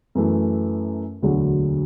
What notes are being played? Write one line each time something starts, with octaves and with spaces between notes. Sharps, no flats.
F#2 E3 A3
E1 D2 D3 F#3